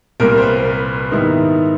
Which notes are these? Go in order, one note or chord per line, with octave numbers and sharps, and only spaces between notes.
C2 A#2 G3 A#4
C5
B4
B4
G#2 D#3 G3 B3 E4